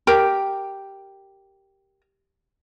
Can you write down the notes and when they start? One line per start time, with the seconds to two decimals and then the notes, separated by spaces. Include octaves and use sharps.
0.07 G4 A#4